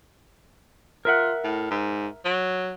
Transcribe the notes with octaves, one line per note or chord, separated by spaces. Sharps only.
F4 A#4 E5 F#5
A2
G#2
F#3